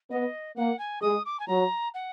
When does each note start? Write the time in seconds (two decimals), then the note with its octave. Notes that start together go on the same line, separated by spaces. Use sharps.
0.10 B3 D#5
0.56 A#3 F#5
0.79 G#5
1.02 G#3 D#6
1.26 D6
1.40 G#5
1.48 F#3 A#5
1.94 F#5